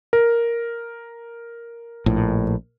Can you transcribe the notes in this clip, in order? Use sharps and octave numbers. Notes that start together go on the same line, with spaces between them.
A#4
A#1 A2